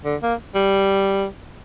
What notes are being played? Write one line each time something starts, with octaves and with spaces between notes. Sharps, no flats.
D3
A#3
G3